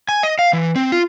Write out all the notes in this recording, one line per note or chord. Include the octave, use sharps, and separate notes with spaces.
G#5
D#5
F5
E3
C4
F4